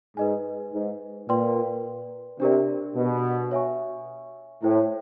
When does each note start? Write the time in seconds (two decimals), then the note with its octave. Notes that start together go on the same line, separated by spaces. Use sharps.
0.17 G#2 B4 D#5 G#5
0.73 G#2
1.28 A#2 B4 D5 G5 C6
2.40 C3 D4 G4 A#4 D5
2.95 B2
3.51 C#5 E5 G#5 C#6
4.62 A2 E4 A4 C5 E5 G5